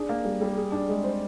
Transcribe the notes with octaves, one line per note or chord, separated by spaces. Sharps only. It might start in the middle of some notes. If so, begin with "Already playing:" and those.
Already playing: D4 G#4
A#3
G3
G3
G#4
D4
G#3
C5